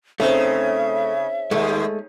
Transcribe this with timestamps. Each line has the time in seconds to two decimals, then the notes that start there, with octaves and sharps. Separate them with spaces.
0.20 C#3 A3 C4 C#4 D#4 E5
1.51 D#2 G#3 A3